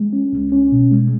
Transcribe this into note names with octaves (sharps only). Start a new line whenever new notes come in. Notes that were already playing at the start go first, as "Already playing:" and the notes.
Already playing: G#3
C#4
C2
C#4
B2
G#3